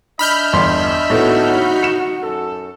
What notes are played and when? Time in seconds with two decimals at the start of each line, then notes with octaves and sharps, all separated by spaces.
0.19 D4 D#5 E5 B5 F6 G6
0.53 G1 E2 C6
1.10 A2 A3 B3 D#4 F#4
1.83 C#7 E7
2.21 F#2 A4